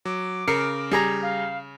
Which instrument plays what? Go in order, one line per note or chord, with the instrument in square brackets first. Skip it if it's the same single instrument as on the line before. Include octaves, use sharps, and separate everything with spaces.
[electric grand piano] F#3 [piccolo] D6
[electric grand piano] C#3 C7 C#7 [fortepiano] A#4
[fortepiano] G3 G#4 A#5
[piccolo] F5